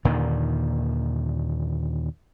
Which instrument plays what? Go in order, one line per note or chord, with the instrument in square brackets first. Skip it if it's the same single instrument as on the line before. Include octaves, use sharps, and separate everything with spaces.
[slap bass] D#2 A#2 D3 D#3